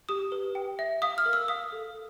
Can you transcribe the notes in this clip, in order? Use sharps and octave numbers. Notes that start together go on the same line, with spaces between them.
G4 D#6
B4
G5
E5
F5 D#6
F6
A#4
E6
F5 D#6
A4